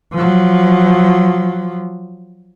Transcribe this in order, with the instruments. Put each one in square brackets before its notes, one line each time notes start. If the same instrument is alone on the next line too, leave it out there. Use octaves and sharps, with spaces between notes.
[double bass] F3 F#3